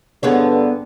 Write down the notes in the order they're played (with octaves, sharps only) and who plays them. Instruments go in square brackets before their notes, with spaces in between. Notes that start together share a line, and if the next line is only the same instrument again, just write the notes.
[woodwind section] G2 D3 [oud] B3 G#4 C#5